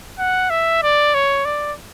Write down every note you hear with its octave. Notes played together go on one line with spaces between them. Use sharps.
F#5
E5
D5
C#5
D5